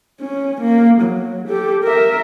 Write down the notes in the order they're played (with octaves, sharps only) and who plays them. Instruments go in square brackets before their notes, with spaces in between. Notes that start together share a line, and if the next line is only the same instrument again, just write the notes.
[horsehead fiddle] C#4
A#3
F#3
G4 A4
A#4 E5